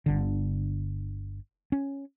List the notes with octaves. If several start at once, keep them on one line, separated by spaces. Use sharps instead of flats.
G1 D3
C#4